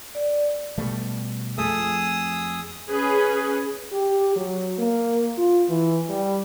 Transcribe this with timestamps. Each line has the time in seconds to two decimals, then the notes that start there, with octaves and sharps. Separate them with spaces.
0.15 D5
0.78 B2 G3 A3
1.58 F2 A3 G#4 D#6 E6
2.89 C#4 G#4 B4
3.92 G4
4.36 F#3
4.79 A#3
5.38 F4
5.69 E3
6.09 G3